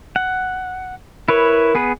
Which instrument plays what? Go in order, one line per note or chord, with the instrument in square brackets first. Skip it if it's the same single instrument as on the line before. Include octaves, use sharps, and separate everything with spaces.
[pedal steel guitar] F#5
[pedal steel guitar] E4 B4 C#5 [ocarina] A#4
[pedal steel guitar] B3 G#4 B4